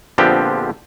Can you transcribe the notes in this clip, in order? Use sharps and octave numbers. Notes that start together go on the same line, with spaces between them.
A#1 D3 F3 B3 C4 G4